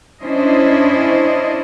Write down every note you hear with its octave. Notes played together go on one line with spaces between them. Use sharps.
C#4 D4 E4 C5 D#5